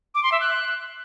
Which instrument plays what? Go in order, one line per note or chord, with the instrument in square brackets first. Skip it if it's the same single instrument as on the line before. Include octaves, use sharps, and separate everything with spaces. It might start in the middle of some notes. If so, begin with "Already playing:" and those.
[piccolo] D6
C6
E5
F#6